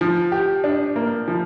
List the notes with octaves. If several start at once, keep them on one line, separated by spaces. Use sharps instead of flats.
F3
G4
D4
A#3
F3